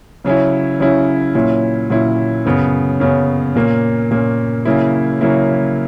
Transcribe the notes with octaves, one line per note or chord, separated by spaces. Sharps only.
C#3 F#3 C#4 E4
C#3 F#3 C#4 E4
A#2 F#3 C#4 E4
A#2 F#3 C#4 E4
F#2 C#3 F#3 B3
F#2 C#3 F#3 B3
A#2 A#3 C#4
A#2 A#3 C#4
C#3 F#3 A#3 E4
C#3 F#3 A#3 E4